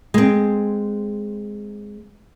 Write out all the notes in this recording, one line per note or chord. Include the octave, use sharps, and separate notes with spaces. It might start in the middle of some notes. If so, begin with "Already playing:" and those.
G#3 C4